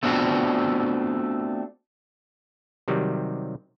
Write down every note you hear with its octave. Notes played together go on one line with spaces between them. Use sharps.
A3 B3 C4 D4 F4 F#4
C3 D#3 F#3 G3